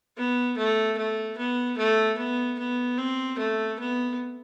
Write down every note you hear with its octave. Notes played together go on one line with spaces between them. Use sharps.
B3
A3
A3
B3
A3
B3
B3
C4
A3
B3